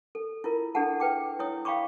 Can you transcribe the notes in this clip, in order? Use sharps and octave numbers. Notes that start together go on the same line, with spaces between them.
A4
E4 F4 A#4
D4 G#4 A4 F#5 A5
B4 G5 D6
E4 C#5 D#6
F5 G5 B5 C#6 D6